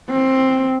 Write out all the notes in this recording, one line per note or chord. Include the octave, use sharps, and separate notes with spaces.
C4